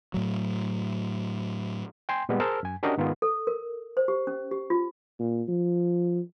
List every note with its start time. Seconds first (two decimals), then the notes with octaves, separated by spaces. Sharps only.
0.14 A2 F#3
2.09 G5 G#5 C6
2.29 A#2 G3 G#3 B3
2.40 G#4 A#4 C5 A5 E6 F6
2.63 F#2 G#5
2.83 C#4 D4 F#4 G4 A#4 D#5
2.98 G#2 D#3 B3 F4 G#4
3.22 A4
3.47 A#4
3.97 C5
4.08 G4
4.27 C#4
4.51 G4
4.70 F4
5.19 A#2
5.48 F3